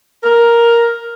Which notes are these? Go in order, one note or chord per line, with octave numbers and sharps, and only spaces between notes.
A#4